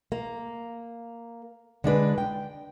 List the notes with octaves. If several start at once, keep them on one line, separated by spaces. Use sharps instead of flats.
A#3
D3 G#3 D4 B4
G5